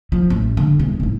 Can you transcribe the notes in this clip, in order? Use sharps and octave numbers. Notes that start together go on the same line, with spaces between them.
F3
A1
D3
E1 G#3
A1 G#2